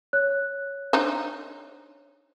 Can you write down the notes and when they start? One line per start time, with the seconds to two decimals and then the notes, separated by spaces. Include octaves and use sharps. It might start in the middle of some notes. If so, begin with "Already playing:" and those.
0.13 C#5 F#6
0.93 D4 D#4 C5